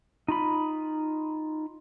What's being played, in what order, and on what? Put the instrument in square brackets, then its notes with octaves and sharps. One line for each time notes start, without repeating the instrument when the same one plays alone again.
[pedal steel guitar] D#4 F4 B5